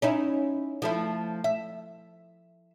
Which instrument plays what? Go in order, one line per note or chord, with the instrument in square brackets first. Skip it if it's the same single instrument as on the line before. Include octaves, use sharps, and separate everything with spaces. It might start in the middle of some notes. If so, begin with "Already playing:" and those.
[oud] C#4 D#4 E4
F3 A3 E4
E5